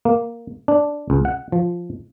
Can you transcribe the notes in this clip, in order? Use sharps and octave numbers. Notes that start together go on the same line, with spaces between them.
A#3
D4
C#2
F#5
F3